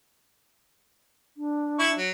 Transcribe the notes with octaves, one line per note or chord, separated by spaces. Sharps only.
D4
E4 C#6
F#3